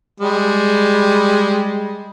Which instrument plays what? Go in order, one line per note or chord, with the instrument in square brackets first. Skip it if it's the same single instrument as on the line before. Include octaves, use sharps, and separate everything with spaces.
[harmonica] G3 G#3